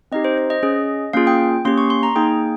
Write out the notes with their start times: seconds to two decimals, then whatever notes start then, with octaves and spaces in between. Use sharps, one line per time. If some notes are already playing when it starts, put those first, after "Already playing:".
0.12 C4 D#4 G4 D#5
0.24 C5
0.38 C5
0.50 D#5
0.63 C#4 G#4
1.13 A#3 C#4 F4 G#4 F5
1.27 G5
1.65 A#3 C#4 G4 C6
1.78 C#6
1.90 C6
2.03 A#5
2.16 A#3 D#4 G#4 G5